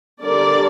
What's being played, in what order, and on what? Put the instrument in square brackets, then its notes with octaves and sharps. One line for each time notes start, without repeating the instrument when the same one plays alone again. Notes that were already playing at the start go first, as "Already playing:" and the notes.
[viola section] D3 G3 D4 A#4 D5